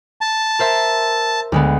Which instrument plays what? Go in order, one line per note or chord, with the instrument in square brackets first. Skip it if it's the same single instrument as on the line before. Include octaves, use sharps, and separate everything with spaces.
[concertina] A5
[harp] A#4 C5 E5
D2 G#3 B3